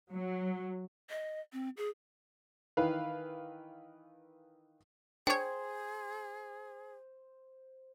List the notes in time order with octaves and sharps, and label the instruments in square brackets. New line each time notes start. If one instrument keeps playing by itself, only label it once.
[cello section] F#3
[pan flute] D#5
C4
G#4
[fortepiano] D#3 E3 B4 F5
[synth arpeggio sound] D4 C#5 [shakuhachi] G#4 [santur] C5 [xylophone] G5 G#6